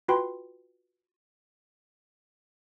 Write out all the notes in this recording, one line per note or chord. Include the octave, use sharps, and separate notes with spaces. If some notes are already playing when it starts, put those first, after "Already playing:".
F4 F#4 B4 G5 B5 C6